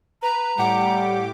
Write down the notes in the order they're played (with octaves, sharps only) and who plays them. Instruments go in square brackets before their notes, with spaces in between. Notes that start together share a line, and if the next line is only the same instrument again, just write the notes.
[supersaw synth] B4 [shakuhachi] A#5
[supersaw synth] A2 G4 D6 [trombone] G3 [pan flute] F#5